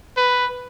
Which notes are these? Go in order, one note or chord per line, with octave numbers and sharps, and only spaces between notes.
B4